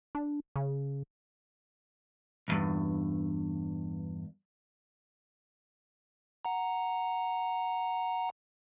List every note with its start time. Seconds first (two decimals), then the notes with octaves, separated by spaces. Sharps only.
0.15 D4
0.56 C#3
2.48 B1 E2 G2
6.45 F#5 A#5